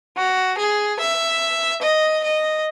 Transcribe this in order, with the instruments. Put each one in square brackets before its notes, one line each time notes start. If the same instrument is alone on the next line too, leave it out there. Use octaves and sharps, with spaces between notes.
[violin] F#4
G#4
E5
D#5
D#5